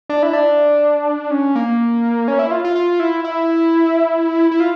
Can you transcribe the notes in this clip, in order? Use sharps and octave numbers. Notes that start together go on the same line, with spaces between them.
D4
E4
D4
C#4
A#3
C#4
E4
F4
F4
F4
E4
E4
E4
F4